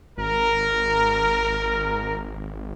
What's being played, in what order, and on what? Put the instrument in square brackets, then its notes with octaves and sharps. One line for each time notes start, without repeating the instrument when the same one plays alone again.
[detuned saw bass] G#1 [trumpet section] A#4